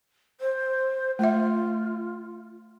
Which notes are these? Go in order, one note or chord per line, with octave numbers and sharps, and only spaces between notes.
C5
A3 F4 E5